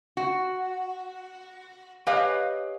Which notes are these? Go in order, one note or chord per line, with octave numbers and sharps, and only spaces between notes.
F#4
G4 B4 C#5 D#5 F5 G#5